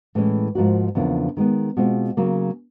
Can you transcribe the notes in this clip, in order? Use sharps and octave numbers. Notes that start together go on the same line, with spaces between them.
A2 E3 G#3 C#4
G#2 F3 A#3 D#4 F#4
E2 C#3 F3 A#3 D4
D#3 G#3 B3
B2 G#3 C4 F4
C#3 F#3 A#3